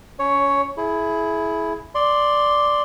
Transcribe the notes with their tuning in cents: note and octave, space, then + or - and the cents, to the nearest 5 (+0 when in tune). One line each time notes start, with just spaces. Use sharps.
C#4 +25 C#5 +5
E4 +0 G#4 +30
D5 +0 C6 +0